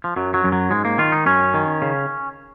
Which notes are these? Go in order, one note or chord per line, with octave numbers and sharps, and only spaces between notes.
F3
F#2 F#3
F#3
F#2
F#3
G#2 G#3
A#3
D#3 F4
D#4
F#2 C#4
D#3
C#3